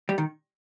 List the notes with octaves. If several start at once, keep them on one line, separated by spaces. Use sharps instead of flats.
G3
D#3